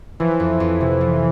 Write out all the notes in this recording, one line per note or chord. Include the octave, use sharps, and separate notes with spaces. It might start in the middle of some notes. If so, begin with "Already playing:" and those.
E3 F3
F2
F2
C3
F3